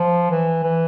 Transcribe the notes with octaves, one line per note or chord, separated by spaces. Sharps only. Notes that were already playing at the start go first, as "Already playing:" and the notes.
Already playing: F3
E3
E3